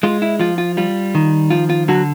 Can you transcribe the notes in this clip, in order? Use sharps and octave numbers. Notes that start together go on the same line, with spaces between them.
G#3 F4
E4
F3 F4
F4
G3 F4
D#3
F3 F4
F4
D3 F#3 F#4